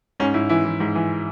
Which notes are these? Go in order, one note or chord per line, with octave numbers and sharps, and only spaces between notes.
G#2 C#4
G#2 E4
E3 E4
E3
G#2
E3